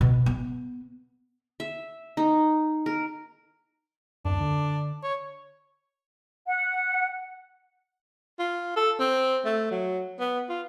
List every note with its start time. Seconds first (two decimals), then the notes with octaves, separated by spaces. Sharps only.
0.01 B2
0.26 B3
1.60 E5
2.17 D#4
2.86 A#4
4.25 D1 F#2 D4
4.41 D3
5.03 C#5
6.47 F#5
8.39 F4
8.76 A4
8.99 C4
9.45 A3
9.71 F#3
10.20 B3
10.49 F4